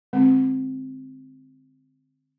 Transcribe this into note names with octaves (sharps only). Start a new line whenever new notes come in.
D3 G#3 C4